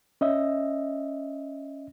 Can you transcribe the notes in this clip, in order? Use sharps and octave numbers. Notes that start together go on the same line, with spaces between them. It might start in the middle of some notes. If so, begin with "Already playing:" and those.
C#4 D#5 E5